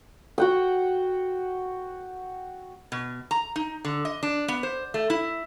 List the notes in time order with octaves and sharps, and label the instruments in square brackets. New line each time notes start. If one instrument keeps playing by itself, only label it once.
[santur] F#4 F#5 G5
[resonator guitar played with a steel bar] B2
A#5
D#4
D3
D#5
D4
B3
C5
A3
E4